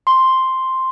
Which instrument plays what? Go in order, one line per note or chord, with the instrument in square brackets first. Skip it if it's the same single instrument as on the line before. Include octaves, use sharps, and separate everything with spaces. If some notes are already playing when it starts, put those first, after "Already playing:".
[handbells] C6